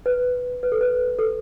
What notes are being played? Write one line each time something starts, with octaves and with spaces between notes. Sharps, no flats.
B4
B4
A4
B4
A4